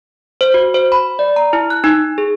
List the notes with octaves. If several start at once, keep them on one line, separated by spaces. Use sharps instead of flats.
C5
F#4
C5
B5
D5
A#5
E4
F#6
D#4
G#4